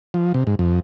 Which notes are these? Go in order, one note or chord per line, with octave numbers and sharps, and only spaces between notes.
F3
C3
G#2
F2